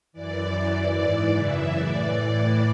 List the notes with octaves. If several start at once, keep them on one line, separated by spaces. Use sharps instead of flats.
F#2 E3 D5
F#2 E3 D5
G#2 E3
F#2 C#3 E3 E5
A2 E3 D5
A2 E3 D5